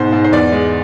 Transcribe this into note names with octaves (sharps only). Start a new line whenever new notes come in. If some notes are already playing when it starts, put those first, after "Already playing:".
Already playing: G#2 B2 C5
G#2
C5
E2 D5
G#3